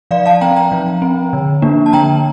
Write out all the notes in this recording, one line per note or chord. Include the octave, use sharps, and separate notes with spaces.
F3 D5 F5
F5 A5
C4 G5 A#5
G5 A#5
F3
C4
D3
F3 A#3 D4
A5
D3 G5 A#5